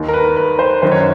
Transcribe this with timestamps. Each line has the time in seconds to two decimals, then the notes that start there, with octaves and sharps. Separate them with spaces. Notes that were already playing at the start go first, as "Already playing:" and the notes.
Already playing: D#2 D#3
0.08 A#4
0.14 B4
0.37 B4
0.59 C5
0.82 F#2 D#3 C5
0.92 C#5